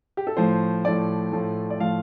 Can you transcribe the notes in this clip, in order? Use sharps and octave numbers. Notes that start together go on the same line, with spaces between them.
G4
A4
A2 F3 A3 C5
A2 F3 A3 D5
A2 F3 A3
D5
A2 F3 A3 F5